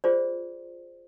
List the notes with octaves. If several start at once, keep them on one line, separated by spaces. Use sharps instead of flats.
F4 G#4 C5 D5